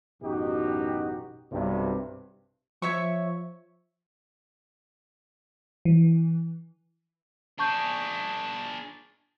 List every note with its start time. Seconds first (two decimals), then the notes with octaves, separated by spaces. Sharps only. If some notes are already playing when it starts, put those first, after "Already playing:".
0.22 A1 F#2 B2 D#4 F#4 G4
1.51 B1 G2 C3
2.82 F3 C#5 E5 C#6
5.85 E3
7.59 D4 G#4 A5 C#6 G6